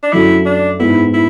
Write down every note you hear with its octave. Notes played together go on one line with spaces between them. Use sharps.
D4
F#2 D3 A3 C#4 E4 F#4
D4
G#2 G#3 B3 E4
E4